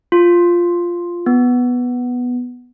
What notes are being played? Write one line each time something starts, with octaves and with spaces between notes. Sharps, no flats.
F4
B3